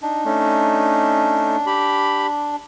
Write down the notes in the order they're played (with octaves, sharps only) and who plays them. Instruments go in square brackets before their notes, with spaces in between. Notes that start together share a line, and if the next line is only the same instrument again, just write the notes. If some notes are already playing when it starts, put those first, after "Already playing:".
[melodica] D4 [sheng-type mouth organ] D#4
[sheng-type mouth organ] A3 C#4 D#4
G4 B5